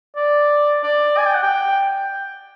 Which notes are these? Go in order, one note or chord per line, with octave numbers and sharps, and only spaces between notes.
D5
D5
G#5
G5
F#5
G5